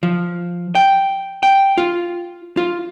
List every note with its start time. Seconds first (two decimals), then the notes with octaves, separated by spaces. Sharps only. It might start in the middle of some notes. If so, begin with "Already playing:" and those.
0.03 F3
0.75 G5
1.43 G5
1.78 F4
2.57 F4